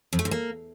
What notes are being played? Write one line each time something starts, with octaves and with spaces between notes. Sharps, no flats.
F2
A3
G#2
A#3